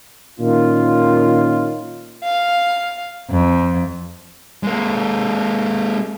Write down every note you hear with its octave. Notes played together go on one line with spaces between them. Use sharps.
A#2 D#3 C#4 F4
F5
F2
G#3 A#3